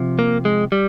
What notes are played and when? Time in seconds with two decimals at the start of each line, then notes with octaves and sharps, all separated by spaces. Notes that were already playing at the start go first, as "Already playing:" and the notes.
Already playing: C3 F3
0.19 A#3
0.45 G#3
0.72 G3